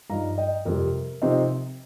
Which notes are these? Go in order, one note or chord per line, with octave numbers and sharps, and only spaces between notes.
G2 F3 D#4 F5 A#5
D#5 G5
F2 C3 G3 A#4
C3 F3 C4 D#4